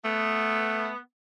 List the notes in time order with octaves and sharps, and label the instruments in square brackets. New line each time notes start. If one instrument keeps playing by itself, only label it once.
[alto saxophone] A3 [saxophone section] B3